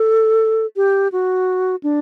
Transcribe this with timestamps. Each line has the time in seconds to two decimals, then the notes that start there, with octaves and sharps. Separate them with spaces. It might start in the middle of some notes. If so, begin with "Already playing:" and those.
Already playing: A4
0.76 G4
1.12 F#4
1.83 D4